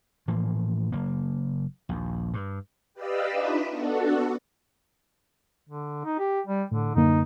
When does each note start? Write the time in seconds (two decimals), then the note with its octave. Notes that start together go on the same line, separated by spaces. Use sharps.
0.28 A2 E3 F3 A#3
0.92 F#1 A#3
1.89 A#1 D#2
2.34 G2
2.94 G4 B4 D5 D#5 F5 E6
3.31 D4 D#4 F4 B4 E5
3.68 B3 D4 F#4 A4
5.69 D3
6.05 D#4
6.19 G4
6.47 G3
6.71 A2 D3
6.96 F#2 D3 A#3 D#4